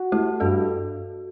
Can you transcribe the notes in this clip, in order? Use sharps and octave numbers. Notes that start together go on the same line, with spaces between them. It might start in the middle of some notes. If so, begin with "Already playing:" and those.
Already playing: F#4
A3 E4 G4
G2 F#4 A4